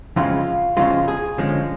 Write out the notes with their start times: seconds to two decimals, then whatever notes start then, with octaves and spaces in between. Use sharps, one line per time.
0.16 F2 C#3 F3 G#3 F4
0.77 F2 C#3 F3 G#3 F4
1.08 G#4
1.38 D3 F3 G#3 C#4